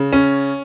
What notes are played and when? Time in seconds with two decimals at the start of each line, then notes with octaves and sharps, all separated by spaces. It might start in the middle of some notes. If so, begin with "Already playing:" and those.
Already playing: C#3
0.13 C#4